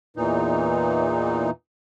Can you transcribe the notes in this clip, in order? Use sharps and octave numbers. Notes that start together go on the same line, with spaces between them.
E2 A#2 E3 D#4